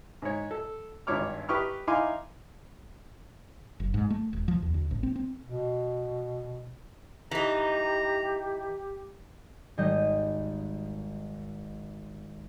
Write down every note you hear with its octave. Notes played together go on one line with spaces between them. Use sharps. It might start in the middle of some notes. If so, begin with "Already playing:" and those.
G#2 C#5
A4
G#1 G2 D4 C#5 D6 F6
G4 B4 G5 C#6 D#6 F6
D#4 E4 F5 G#5 C6 D6
F#1
G#2
A3
E1
F3
E2
D2
A1
C4
C4
B2
E3 D#4 G4 A#5
G#1 G3 D#5 G6 D#7